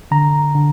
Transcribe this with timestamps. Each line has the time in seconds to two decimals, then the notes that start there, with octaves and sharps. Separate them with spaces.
0.11 D3 A#5
0.55 D3